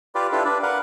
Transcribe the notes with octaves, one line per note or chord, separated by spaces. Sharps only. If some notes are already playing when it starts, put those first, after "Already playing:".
F4 G4 B4 D5
D4 E4 F4 G4 A4 B4
D4 B4 D5
A#4 B4 F5 F#5